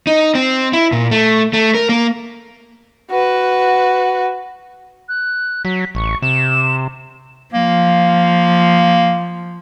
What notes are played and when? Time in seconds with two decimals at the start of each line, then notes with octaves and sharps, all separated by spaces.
0.07 D#4
0.35 C4
0.73 E4
0.92 A#2
1.11 A3
1.53 A3
1.74 A#4
1.89 A#3
3.10 F#4 B4
5.09 F#6
5.65 F#3 B6
5.95 A1 C#6
6.22 C3 E7
7.54 F3 A#3